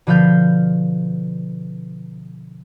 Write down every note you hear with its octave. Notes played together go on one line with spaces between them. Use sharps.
B2 D3 F3 B4 F5 G6